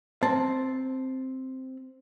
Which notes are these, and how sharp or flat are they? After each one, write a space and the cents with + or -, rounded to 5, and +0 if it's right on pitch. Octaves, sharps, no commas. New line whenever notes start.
C4 +0 A5 +0